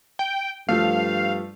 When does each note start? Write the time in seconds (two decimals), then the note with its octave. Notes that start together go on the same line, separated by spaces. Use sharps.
0.19 G5
0.69 G2 F3 A3 F5